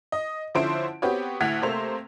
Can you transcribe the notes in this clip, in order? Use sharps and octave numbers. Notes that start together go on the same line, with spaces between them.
D#5
D3 F3 C#4 E4 C5 D7
B3 C4 F#4 G4 B4 C#5
D2 A2 F#5 G#6 B6 F7
C3 A3 A#3 C5 F7